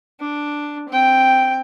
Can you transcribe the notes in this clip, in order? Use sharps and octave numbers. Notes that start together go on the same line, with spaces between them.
D4
C4 G5